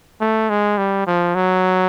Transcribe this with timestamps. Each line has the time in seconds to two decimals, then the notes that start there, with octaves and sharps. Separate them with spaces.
0.21 A3
0.50 G#3
0.78 G3
1.06 F3
1.35 F#3